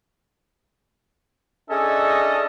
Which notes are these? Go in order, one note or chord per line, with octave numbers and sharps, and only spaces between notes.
C#4 D4 E4 G#4 A4 D#5